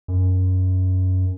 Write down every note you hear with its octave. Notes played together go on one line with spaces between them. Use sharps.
F#2